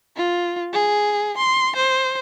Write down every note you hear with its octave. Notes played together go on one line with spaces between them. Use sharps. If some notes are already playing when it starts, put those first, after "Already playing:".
F4
G#4
C6
C5